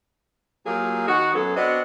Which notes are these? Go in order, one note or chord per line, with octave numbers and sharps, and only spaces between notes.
F3 F#3 A#3 G4 G#4
D#3 D#4 F#4
F#2 F#3 B3 G#4 A4
B3 C4 D4 F#4 D#5